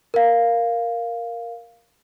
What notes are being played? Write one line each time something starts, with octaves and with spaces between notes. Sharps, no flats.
A#4 F5